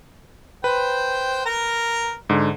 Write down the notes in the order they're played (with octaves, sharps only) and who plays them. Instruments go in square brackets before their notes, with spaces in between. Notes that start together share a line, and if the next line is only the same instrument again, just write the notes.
[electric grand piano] B4 [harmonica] C5 G5
[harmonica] A#4 A#5
[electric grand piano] G#2 D3